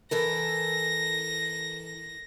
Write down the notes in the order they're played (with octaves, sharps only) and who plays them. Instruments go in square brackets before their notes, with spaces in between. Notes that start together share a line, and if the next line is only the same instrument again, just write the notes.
[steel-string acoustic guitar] E3 A4 A#4 [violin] A#6